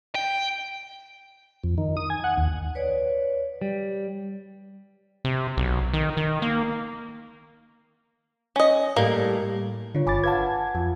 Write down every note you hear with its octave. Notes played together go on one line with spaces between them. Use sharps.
G5
F2
D#3
D#6
G#5
F#5
D#2
B4 C#5 D5
G3
C3
B1
D#3
D#3
A#3
C#4 D#5
A2 G3 A#3
D3 F4 C#5
G1 G#5 B5 D6 A6
B4 F5 F#5 A5 G#6
F2 F4